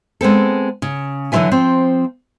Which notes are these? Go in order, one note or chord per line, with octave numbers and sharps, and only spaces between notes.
G#3 B3 C4 A4
C#3
D3 E3 F#3 F4 E5 G#5
F3 C4